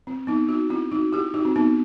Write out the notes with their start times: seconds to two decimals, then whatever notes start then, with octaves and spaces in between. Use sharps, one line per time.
0.07 C4
0.27 B3 D#4
0.49 D#4 F#4
0.70 C4 E4
0.92 D#4 F#4
1.13 E4 G4
1.34 D#4 F#4
1.45 C4
1.56 B3 D#4